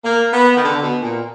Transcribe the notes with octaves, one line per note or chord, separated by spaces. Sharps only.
A#3
B3
D#3
D3
B2
A#2